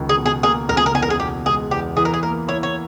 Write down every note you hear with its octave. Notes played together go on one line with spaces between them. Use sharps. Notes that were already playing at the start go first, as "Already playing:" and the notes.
Already playing: C#2 D#3
G#4
B2
G#4
A#3 G#4
C#2 A#4
G#4
A#4
E2 G#4
A#4
G#4
B2 G4
G#3 G#4
E2 G4
E3 G#4
A#4
G#4
A#3 A#4
E4 C#5
C#5